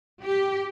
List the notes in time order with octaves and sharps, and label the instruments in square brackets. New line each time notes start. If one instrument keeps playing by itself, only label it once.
[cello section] G4